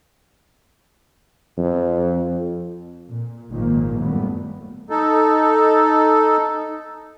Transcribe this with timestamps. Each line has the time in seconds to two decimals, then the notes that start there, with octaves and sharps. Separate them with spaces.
1.57 F2
3.08 A#2
3.50 G#1 A#2 D#3 F3 A#3
3.99 F#2 A2 G3 A3 B3
4.90 D#4 A4